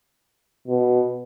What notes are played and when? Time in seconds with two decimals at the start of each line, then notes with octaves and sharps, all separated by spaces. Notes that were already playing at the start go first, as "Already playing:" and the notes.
0.68 B2